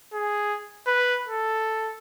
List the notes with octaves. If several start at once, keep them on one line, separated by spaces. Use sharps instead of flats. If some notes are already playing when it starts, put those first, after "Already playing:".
G#4
B4
A4